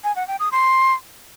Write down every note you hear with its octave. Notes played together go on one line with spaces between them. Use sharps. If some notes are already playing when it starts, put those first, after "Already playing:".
G#5
F#5
G5
D#6
C6